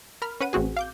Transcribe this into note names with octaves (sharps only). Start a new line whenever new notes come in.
A#4 B5 F6
C#4 B4 F#5 D#7
A1 C4 F#4 G#4
F5 D6 G6